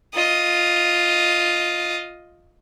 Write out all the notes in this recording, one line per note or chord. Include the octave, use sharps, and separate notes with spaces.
F4 D#5